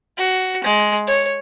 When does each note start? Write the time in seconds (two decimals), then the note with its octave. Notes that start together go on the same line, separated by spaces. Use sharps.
0.18 F#4
0.64 G#3
1.08 C#5